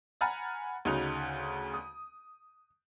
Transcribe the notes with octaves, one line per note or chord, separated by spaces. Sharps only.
F#5 G#5 A#5 B5 F6 A6
D2 C#3 D#4 F#4 F7
D#6